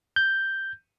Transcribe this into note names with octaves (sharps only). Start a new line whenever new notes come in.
G6